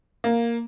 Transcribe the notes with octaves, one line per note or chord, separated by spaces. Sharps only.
A#3